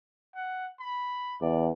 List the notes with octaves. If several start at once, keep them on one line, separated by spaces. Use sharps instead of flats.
F#5
B5
E2 D5